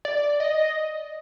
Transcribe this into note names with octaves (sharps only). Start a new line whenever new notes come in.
D5
D#5